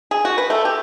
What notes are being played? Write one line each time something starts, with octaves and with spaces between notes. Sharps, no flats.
G#4
F#4
B4
A3
G4